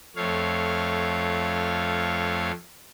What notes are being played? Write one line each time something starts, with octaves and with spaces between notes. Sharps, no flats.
F2 A3 C#5 F5